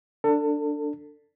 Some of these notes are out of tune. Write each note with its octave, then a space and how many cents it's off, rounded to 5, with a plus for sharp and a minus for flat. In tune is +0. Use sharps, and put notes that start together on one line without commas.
D4 +0 A4 +25